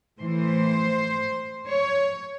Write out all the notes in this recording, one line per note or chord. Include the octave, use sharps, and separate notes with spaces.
A2 E3 C5
C#5